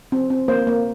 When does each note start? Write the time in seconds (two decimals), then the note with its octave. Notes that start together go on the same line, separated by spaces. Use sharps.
0.12 C4
0.30 C4
0.48 A#3 C5
0.67 A#3